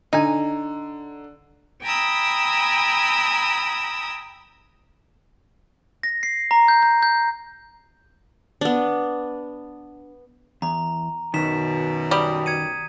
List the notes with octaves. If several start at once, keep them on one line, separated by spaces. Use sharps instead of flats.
D3 D#4 G#5
G5 G#5 A#5 B5 D#6 E6
A#6
C7
A#5
G6
G6
G6
B3 D4
E2 A#5
F#2 B2 D#3 B6 E7
G3 D#6
G#6 C#7 D#7